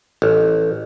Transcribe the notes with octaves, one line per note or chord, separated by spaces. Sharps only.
A1